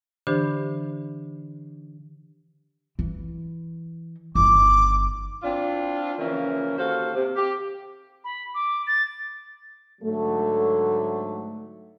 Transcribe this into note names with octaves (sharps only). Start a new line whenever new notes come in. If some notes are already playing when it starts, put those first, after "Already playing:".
D3 E3 D4 G4 C5 B5
E3
G1 D#3 D6
C4 D4 E4 F4
C#3 E3 F3 A#3 C#4
D#2 F#4 A4 C5 F5
C3
G4
B5
D6
A6
G#2 D3 F#3 A3